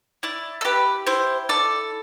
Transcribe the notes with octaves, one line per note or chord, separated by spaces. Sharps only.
E4 D5
A4
G4 B4
E4 C5
A4 D5